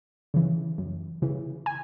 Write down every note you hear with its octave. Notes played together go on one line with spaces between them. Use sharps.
C#3 E3
F#2
C#3 E3
G#5